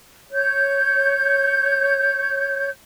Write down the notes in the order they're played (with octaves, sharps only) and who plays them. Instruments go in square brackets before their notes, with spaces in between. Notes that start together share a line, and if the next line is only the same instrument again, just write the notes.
[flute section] C#5 G6